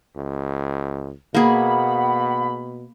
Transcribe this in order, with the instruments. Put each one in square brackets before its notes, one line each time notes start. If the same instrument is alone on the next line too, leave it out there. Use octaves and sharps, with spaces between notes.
[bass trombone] C#2
[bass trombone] B2 [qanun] A#3 G#4 [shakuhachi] F#5 [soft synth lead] B5